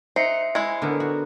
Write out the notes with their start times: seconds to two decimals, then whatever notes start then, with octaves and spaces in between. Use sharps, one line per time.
0.16 D#4 C5 E5 C7 C#7
0.55 G#3 E4
0.82 D3 B3 A#4
1.00 F#4